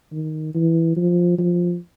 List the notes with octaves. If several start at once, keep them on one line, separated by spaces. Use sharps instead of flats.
D#3
E3
F3
F3